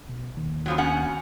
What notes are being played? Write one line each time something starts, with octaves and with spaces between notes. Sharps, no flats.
B1
D#2
C#3 F3 F#3
B2 C#4 F#5